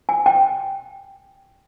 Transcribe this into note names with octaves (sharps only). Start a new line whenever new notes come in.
G#5
G5